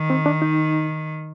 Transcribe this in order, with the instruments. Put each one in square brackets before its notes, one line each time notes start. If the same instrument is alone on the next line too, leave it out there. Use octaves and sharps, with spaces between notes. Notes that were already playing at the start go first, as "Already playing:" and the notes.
Already playing: [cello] D#3
[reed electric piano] C4
D4
D#4